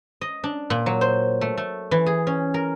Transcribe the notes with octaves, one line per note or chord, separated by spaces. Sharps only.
D#5
D4
A#2
F#3
C5
A3
A3
E3
G#4
C#4
A#4